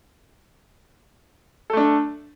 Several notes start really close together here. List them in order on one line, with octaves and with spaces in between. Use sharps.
A4 A3 D4